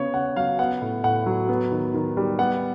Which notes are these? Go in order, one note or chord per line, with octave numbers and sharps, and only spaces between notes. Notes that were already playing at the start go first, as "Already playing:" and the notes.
Already playing: C#3 B3 C#5
C#3 F#5
F#3 F5
B3 F#5
A2
A2 F#5
F#3
B3
D#3
D#3
G3
B3 F#5